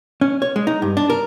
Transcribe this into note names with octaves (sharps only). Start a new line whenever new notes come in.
C#4
C#5
G#3
D#4
G2
D4
A#4